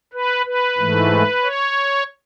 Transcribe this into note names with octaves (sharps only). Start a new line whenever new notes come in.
B4
B4
G#2 E3 A3
C#5